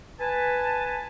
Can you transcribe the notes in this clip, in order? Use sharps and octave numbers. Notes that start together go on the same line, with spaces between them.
B4 G#5 A5